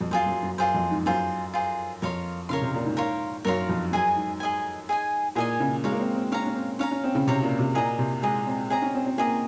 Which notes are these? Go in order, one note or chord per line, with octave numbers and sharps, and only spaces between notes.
F2
F#2 F4 G#4 C5
F#2
F#2
F#2 F4 G#4 C5
F2
G#2
F#2 F4 G#4 C5
F4 G#4 C5
F2 A#4 C#5 F5 C6
C#3 A#4 C#5 F5 C6
C3
A#2
G#2
A#4 C#5 F5 C6
F#2 A#4 C#5 F5 C6
F2
F#2 G#4 D#5 G#5
G#2
G#4 D#5 G#5
G#4 D#5 G#5
A#2 G#4 D#5 G#5
C#3
G#3 C#5 F5 A#5
A#3
C4
C4
C#4 C#5 F5 A#5
C#4
C4
C#4 C#5 F5 A#5
C#4
C4
C#3
C3 C#5 F5 A#5
A#2
C3
A#2 G#4 D#5 A#5
C3
G#3 G#4 D#5 A#5
C4
C4 G#4 D#5 A#5
C#4
C4
C4
A#3 G#4 D#5 A#5